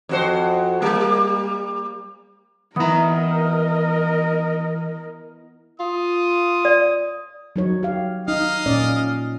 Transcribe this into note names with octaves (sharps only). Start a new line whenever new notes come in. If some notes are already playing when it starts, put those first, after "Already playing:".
F2 F#4 C5
G3 A#3
E3 B3 E4 A#4 D#5 A#5 D#6
F4 D#6
D5
F#3 D#4 C#5
G4 F5
D#4 D#5 F5
A#2 C#4 D5